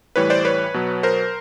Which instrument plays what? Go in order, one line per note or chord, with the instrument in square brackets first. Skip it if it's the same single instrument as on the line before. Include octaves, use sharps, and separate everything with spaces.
[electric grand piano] A2 E3 G3 B4 C#5
C5 D5
B4 C#5
B2 F#3
A#4 C5